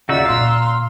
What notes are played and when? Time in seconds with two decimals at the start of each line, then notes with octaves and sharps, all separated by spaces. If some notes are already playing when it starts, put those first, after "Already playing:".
0.09 D#2 C#3 D#4 F4 F#4 D5 E5 E6
0.25 A#2 D3 F5 A#5 C6 F#6